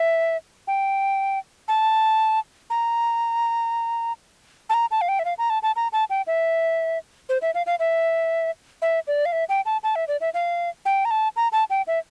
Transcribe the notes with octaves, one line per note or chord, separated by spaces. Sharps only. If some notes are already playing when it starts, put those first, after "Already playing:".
Already playing: E5
G5
A5
A#5
A5
A#5
A5
F5
G5
E5
F5
A#5
A5
A5
A#5
A5
G5
E5
C5
E5
F5
F5
E5
E5
D5
F5
E5
G5
A5
A5
E5
D5
E5
F5
G5
A#5
A5
A#5
A5
G5
E5